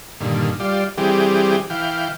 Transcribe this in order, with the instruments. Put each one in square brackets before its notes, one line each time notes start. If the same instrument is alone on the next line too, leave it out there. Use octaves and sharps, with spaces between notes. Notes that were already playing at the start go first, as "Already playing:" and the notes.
[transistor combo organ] G2 A#2 D3 D#3
G3 F4 D5
E3 G3 C4 G4 G#4
E3 F5 G5